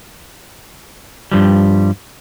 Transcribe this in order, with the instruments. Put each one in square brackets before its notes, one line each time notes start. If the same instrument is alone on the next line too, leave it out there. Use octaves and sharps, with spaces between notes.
[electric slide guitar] G2 F3 G3